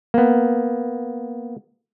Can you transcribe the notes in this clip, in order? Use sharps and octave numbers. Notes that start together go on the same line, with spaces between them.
A#3 B3